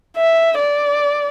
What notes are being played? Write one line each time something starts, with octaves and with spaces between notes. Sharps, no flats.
E5
D5